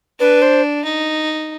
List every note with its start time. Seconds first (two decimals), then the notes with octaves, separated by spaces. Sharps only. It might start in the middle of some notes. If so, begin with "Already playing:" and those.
0.20 D4 B4
0.42 C5
0.85 D#4